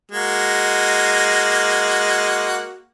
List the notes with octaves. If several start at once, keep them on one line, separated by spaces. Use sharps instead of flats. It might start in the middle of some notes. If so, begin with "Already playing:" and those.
G#3 A#3 F#4